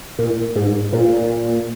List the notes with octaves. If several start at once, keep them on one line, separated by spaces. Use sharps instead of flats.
A#2
G#2
A#2